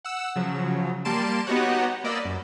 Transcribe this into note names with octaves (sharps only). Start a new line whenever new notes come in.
F#5 E6
C#3 F3 F#3
G3 A#3 A5 C6 D7 E7
B3 D#4 F#4 G4 C#5 F#5
A#3 D5 D#5 B5 E6
F#2